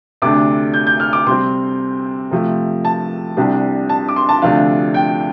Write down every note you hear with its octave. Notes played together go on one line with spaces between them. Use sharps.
D2 C3 A3 D4 D6
G6
G6
F6
D6
C3 G3 C4 C6
C3 F3 A3
A5
C2 C3 G3 D4
A5
D6
C6
A5
D2 C3 F3 A3 D4 F5
G5